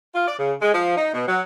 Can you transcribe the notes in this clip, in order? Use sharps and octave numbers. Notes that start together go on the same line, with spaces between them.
F4
D5
C#3
G#3
F3
D#4
B2
F#3